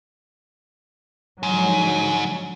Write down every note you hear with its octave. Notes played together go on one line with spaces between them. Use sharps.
G#2 D3 F3 F#3